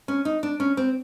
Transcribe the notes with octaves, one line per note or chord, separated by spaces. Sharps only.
C#4
D#4
D4
C#4
C4